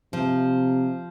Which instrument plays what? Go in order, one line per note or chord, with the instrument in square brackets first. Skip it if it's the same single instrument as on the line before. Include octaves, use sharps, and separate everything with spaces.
[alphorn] C3 [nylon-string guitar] F3